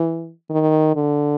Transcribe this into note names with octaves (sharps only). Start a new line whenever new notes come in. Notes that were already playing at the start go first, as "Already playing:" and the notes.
Already playing: E3
D#3
D3